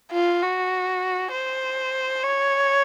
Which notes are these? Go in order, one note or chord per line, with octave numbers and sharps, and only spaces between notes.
F4
F#4
C5
C#5